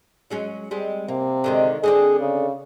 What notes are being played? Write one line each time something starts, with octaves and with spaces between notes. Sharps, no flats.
F#3 G#3 C#4
G3 G#3 C4
C3 A#3
D3 D#3 G#3
D3 C4 D4 G#4
C#3